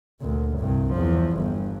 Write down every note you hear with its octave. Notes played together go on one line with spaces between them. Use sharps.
D2 A#2
C2 G2
E2 F3
G1 G2